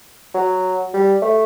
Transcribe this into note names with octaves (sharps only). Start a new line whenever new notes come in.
F#3
G3
A3